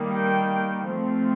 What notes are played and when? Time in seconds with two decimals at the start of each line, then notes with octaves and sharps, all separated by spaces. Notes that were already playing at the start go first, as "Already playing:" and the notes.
Already playing: D#3 G3 A#3
0.14 G5
0.87 F3 A3 C4